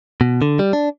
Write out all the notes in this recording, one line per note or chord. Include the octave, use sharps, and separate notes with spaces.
B2
D3
G3
D4